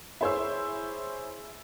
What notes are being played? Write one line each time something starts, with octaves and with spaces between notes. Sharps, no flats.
E4 G#4 C5 C#5 C6 E6